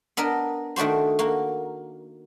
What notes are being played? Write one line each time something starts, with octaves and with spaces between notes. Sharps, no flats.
B3 D4 A#4 D#5
D#3 A3 D4 F#4 C5
A#3 F#4